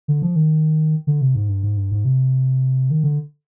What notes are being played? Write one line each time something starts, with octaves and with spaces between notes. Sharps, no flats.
D3
F3
D#3
D3
C3
G#2
G2
G#2
G2
G#2
C3
D#3
D3